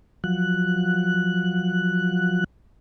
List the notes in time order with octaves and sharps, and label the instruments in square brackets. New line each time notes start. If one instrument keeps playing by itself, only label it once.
[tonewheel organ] F3 F#3 F#6